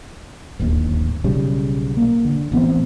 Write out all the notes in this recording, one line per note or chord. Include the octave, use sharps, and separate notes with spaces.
D1 G1 D#2
B1 C#3 G3
A#3
D3
A1 B3 C4